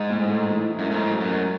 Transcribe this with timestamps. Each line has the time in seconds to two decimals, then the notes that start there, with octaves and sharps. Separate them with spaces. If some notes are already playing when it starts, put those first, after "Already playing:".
Already playing: G#2
0.10 A2
0.30 A3
0.50 E3
0.70 E4
0.79 F#2
0.91 G#2 A3
1.11 F#3
1.20 F#2
1.31 F#3